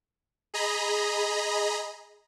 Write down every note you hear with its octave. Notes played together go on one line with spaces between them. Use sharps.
G#4 D#5 A#5 B5